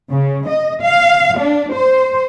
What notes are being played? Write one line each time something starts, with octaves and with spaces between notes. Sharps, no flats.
C#3
D#5
F5
D4
C5